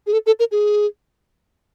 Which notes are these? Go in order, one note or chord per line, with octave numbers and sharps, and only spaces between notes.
G#4
A4
A4
A#4
G#4